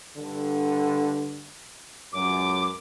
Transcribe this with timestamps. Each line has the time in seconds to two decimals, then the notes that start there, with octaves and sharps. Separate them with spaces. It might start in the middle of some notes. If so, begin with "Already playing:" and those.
0.18 G2 D3
2.13 C#2 F#2 D6